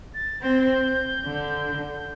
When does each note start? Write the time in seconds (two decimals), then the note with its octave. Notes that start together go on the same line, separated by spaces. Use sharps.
0.14 A6
0.42 C4 G6
1.25 D3
1.98 G6